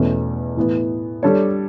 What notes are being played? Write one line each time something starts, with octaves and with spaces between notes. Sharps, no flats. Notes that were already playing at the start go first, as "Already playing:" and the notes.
Already playing: E2 B2 A3 C#4
A2 E3 B3
G3 D4 A4 C#5